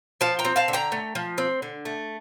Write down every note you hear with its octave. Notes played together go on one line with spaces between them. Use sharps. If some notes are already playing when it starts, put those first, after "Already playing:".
F3 F5 A5
G5 A#5
C4
F5 A5
D3
G5 A#5
A3
F3
C4
D3
A3